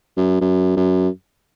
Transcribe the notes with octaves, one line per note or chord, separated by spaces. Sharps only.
F#2
F#2
F#2